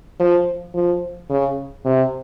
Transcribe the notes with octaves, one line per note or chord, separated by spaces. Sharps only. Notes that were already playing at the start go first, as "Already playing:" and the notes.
F3
F3
C#3
C3